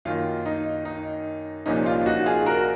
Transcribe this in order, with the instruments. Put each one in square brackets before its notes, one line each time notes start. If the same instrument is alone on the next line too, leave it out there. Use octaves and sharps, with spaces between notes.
[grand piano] F#2 D#3 A#3 F4
D#4
D#4
C2 A#2 F3 A#3 C#4 D#4
F4
D#4 F#4
F4 G#4
F#4 A#4